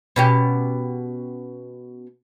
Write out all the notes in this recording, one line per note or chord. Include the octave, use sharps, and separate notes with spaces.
B2 C#4 G4